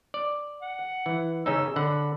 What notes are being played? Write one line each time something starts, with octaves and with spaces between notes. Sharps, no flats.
D5
F#5
E3
C#3 C#4 D#4 E6
D3 F#5 B5